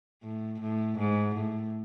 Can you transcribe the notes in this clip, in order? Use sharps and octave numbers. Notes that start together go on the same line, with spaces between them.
A2
A2
G#2
A2